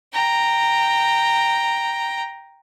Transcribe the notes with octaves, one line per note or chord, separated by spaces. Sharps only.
G5 A#5